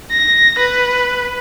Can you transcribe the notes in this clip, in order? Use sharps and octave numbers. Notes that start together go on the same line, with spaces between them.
A#6
B4